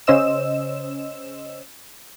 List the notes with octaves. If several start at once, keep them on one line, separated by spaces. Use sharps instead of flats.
C#3 C#4 C5 D#5 E6 E7